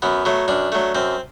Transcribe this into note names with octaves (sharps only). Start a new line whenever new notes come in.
F#2 B3
F#3 A3
F#2 D4
F#3 A3
F#2 C4